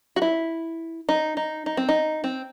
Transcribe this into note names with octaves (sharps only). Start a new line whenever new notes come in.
F#4
E4
D#4
D#4
D#4
C4
D#4
C4